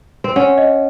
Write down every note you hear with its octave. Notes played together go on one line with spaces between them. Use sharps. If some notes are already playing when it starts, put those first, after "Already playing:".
C4
C#4 F#5
D#5